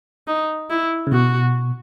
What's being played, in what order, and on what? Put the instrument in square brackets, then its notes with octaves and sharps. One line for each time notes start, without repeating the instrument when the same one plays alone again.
[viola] D#4
E4
[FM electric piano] C#3
[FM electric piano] B2 [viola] F#4